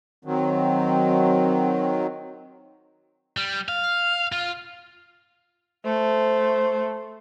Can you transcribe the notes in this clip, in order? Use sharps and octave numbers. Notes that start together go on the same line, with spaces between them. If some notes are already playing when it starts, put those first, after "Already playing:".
D#3 F#3 C4
G3
F5
F4
A3 C5